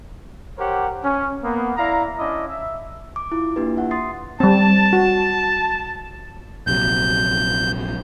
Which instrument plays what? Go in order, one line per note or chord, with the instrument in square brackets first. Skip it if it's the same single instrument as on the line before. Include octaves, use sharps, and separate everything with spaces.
[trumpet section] G4 A#4 C5 C#5 F#5
C#4
A#3 B3
E4 D5 F5 A#5
C#4 D4 E4 D5 D#5
E5
[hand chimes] D6
E4 F4
A#3 D4 E4 F4 G4 B4
E5 F#5
C6 D#6 A6 C7
[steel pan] G3 C4 [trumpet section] A5
[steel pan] F#4
[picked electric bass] A#1 C3 F#3 [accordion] G6